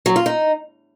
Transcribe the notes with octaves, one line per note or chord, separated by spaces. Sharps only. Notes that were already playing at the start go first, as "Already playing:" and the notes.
F#3
F4
D#4